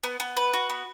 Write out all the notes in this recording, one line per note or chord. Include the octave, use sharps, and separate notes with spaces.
B3
B3
B4
F#4
B3